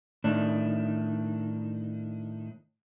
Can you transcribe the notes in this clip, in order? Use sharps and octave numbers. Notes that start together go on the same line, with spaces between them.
A2 D#3 D4